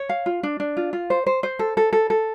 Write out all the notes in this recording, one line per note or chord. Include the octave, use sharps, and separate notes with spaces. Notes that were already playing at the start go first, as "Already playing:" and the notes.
Already playing: C#5
F5
F4
D4
D4
F4
F4
C5
C5
C5
A4
A4
A4
A4